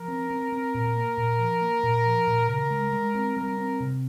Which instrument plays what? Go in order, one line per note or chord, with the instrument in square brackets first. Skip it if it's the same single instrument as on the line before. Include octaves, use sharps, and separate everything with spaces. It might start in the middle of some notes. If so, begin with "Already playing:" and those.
Already playing: [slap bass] F3 [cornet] A#4
[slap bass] C4
C4
C4
A#2
A#3
A#2
F3
A#3
A#2
F3
A#2
[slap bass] C#3 [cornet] A#4
[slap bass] G#3
G#3
C4
[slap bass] G3 [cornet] A#4
[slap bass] C4
C3